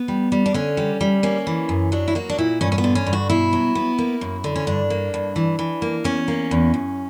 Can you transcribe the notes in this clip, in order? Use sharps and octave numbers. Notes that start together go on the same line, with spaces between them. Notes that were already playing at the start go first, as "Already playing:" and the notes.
Already playing: B3
G3
G3
D4
D3 C#4
G3
G3
A#3 C#4
E3
F#2
F#3 D4
E4
A#3 F#4
D4
A#2 E4
G2 C#4
C#4
B3
D3
C#4
G2
F#4
B2 E4
F#3
B3
A#3
F#2
D3
C#4
G2 D4
A#3
G2
E3
E3
A#3
E2 C#4
A#3
E2
F#2